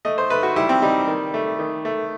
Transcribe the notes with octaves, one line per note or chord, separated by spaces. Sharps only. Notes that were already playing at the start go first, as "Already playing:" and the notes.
A3 D#5
C5
A3 B4
F#4
G3 E4
C4
G3 D#4
D#3
A3
D#3
A3